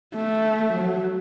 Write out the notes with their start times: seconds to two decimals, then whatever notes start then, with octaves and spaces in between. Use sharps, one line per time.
0.15 A3
0.73 F#3